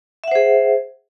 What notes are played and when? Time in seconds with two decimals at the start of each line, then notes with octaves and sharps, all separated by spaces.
0.24 E5
0.28 F#5
0.31 C5
0.35 G#4